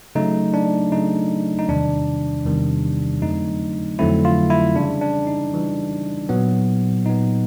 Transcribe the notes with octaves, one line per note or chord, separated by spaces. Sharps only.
C#3 F#3 A3 D#4
D4
C#3 F#3 A3 D#4
D#4
E2 C3 D#3 G3 D4
E2 C3 D#3 G3
F2 D3 F#3 A3 C4 D#4
F2 D3 F#3 A3 C4 E4
F4
E4
C#3 E3 G3 D4
D4
D#4
C#3 E3 G3
A#2 F#3 B3
A#2 F#3 B3 D#4